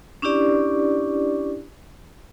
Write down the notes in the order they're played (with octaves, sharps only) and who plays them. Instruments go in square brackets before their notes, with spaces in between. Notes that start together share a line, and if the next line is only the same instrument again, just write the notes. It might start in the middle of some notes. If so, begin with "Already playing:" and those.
[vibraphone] C#4 D4 E4 G4 D5